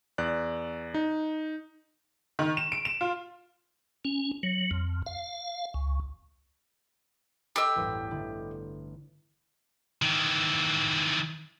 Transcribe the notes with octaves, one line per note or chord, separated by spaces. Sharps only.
E2 D5 F#6
D#4
D#3
E7
D7
E7
F4
C#4
F#3
F2
F5
C#2
G4 A4 D#5 B5 E6
A1 E2 G2
D3 E4
D#3 E3